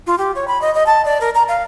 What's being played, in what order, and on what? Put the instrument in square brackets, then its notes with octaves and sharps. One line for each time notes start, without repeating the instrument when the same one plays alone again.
[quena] F4
G4
C#5
B5
D#5
D#5
A5
D5
A#4
A#5
F5